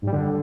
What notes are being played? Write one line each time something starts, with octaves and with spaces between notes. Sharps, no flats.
G2
G3
D3